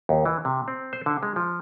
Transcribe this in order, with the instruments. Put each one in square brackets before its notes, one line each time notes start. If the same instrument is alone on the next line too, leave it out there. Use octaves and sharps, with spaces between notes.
[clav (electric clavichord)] D#2
E3
C3
C4
C5
D3
G#3
F3